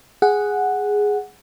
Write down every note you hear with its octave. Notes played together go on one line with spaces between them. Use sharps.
G#4 F#5